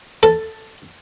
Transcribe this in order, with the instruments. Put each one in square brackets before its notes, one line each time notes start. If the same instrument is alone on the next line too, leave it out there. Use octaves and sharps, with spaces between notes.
[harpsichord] A4